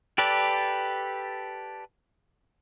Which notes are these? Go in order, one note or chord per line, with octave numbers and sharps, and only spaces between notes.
G4 A4 B4 D5